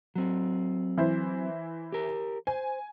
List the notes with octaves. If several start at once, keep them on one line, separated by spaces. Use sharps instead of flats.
F#3 C4
E3 E4 C5
G4 A#4
C5 G#5